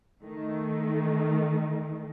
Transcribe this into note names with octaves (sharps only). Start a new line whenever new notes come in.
D#3 A3